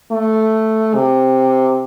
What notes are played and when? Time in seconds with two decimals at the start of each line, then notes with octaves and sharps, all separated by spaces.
0.12 A3
0.95 C3